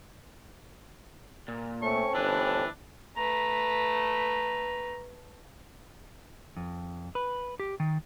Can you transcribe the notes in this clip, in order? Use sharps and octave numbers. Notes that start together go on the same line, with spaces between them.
A#2
A3 C4 C#4 A4 C#6
G1 D4 E4 B4
A3 B4 A#5
F2
B4
G4
D#3